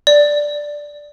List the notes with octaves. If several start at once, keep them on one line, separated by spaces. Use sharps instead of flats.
D5